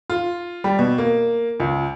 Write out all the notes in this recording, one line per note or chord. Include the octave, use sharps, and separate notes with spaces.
F4
G3
B2
A#3
C#2